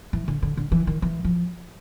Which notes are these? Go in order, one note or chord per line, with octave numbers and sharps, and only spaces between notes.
E3
D3
D3
D3
E3
D#3
E3
F3